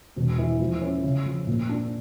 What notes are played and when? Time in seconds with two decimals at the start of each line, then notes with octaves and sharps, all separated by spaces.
0.16 E1
0.38 E3
0.60 F3
0.82 C#4
1.04 C#3
1.26 F3
1.47 A#2
1.69 D4